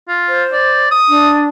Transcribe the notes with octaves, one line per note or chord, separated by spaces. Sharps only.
F4
C5
D5
D#6
D4